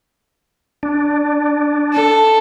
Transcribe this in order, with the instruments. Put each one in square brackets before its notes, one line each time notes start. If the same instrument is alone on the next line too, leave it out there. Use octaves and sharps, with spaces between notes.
[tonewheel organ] D4
[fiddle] A4